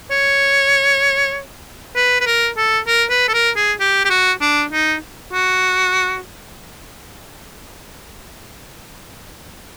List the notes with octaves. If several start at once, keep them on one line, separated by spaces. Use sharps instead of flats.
C#5
B4
B4
A#4
A4
A#4
B4
A4
A#4
G#4
G4
G4
F#4
D4
D#4
F#4